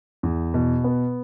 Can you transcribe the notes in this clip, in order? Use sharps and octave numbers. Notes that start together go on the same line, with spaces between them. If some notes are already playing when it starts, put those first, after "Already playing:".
E2
B2
B3